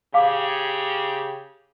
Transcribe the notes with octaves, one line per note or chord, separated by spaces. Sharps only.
C#3 G4 F5 D6